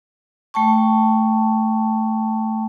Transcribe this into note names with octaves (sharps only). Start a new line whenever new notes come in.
A3 G5 A5 C#6